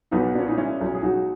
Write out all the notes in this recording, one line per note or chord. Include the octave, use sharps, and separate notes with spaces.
B1 B3 D#4
A#2 C#4
D#4
G#3 C#4 E4
B1
G#4
B1 D#4 F#4